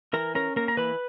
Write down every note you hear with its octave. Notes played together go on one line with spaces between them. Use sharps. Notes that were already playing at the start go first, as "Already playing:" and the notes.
E3 A#4 A#5
C#4 A#4 A#5
A#3 A#4 A#5
A#5
E3 B4 B5